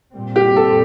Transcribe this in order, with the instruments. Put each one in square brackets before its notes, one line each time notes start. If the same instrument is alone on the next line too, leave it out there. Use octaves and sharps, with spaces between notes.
[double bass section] A#2 G3 C4
[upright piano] G4
A4